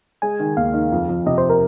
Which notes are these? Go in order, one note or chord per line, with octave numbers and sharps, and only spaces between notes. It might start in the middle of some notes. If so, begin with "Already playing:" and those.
G#3 G#5
D#3
D#2 F5
D#3
F2
F2
C3 D#5
C5
A#4